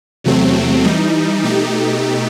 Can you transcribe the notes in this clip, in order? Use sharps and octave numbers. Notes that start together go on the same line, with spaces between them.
E2 C3 F#3 A3 C4
E3 G3 D#4
B2 A3 D#4 G4